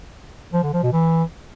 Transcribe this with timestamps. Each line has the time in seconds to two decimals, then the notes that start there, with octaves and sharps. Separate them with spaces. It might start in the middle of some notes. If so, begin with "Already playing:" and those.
0.54 F3
0.63 D3
0.73 F3
0.83 B2
0.92 E3